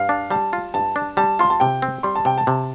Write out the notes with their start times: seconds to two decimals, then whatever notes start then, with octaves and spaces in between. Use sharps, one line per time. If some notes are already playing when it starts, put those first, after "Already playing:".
Already playing: G2 F5
0.09 D4
0.30 G3 A5
0.53 F4
0.74 G2 A5
0.96 D4
1.17 G3 A5
1.39 F4 C6
1.50 A5
1.60 C3 G5
1.82 C4
2.03 G3 C6
2.16 A5
2.25 C3 G5
2.38 A5
2.47 C3